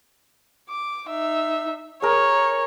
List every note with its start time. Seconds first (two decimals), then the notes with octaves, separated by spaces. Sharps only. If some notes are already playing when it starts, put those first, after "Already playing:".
0.69 D6
1.08 D#4 E5
2.02 G#4 A#4 C#5